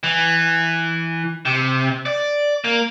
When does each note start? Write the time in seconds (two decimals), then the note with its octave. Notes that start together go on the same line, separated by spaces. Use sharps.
0.03 E3
1.45 C3
2.06 D5
2.64 A#3